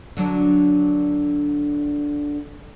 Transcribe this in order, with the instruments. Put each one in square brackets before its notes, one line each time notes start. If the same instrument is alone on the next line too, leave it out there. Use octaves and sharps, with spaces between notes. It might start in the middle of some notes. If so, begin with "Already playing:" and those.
[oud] D3 F#3 D4